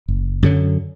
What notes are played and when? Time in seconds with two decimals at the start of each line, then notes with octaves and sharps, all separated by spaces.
0.08 F#1
0.42 F#2 D3 F#3